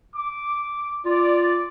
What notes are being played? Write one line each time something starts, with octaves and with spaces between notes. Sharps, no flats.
D6
F4 D5